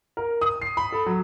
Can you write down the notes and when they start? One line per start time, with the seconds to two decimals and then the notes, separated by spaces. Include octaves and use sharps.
0.17 A#4
0.41 D#6
0.62 C7
0.77 B5
0.92 A4
1.06 F#3